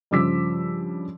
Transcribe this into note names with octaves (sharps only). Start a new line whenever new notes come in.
G2 C#3 F3 D6 E6 B6